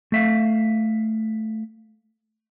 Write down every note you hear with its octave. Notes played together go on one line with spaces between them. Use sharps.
A3 E5 F5